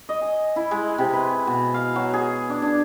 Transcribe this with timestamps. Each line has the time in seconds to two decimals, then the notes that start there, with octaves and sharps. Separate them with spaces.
0.09 D#5
0.22 G#5
0.56 E4
0.71 G#3
0.98 C3
1.13 B4
1.47 B2
1.74 F5
1.96 F#3
2.14 G#4
2.50 D4
2.62 D4